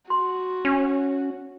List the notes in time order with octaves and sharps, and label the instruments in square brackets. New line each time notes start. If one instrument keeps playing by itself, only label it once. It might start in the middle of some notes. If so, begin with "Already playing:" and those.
[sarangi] F#4 [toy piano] C6
[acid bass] C#4